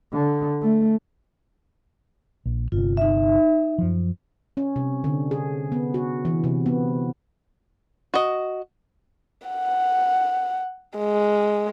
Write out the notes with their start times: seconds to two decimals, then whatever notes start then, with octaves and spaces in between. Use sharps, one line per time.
0.13 D3
0.61 A3
2.45 A#1
2.72 G1 C3 F4
2.97 D#4 E5
3.78 F#2 F3
4.57 C#4
4.76 C3
5.04 D3
5.31 G#4
5.72 B3
5.94 F#4
6.25 E3
6.44 C3
6.66 B3
8.14 F#4 D#5
9.48 F#5
10.98 G#3